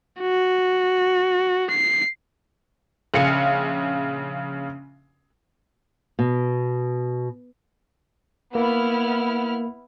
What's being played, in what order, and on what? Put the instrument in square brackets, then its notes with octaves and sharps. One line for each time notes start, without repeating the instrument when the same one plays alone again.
[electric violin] F#4
C7
[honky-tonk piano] A#1 C#3 F5 C#7
[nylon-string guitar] B2
[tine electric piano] A#3 [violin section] B3 E4 F6